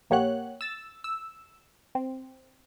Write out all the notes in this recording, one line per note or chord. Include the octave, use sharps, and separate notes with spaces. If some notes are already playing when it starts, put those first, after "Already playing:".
A#1 A#3 G4 C#5 F#5 F#6
E6 A6
E6
C4